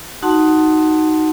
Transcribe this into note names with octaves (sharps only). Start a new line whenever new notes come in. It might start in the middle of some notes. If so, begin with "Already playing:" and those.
D#4 F#4 F#5 A5 C6